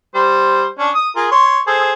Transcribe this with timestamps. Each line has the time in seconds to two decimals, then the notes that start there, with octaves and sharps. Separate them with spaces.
0.15 G3 C5 C6
0.79 C#4 D4
0.95 D#6
1.16 F4 G#4 A#4
1.31 C#5 C6
1.67 G#4 A4 C5